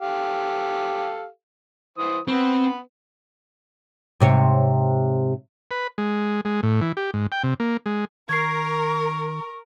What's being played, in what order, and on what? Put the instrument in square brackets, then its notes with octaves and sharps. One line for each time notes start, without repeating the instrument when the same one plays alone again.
[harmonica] G4 A4 F5
E3 C5 D#6
[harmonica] B3 B4 [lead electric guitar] C4
[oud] G#2 C3 C#5
[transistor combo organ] B4
G#3
G#3
A2
E3
G4
G#2
G5
C3
A#3
G#3
[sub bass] D#3 [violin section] A#4 [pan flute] C#6 [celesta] G#6 C7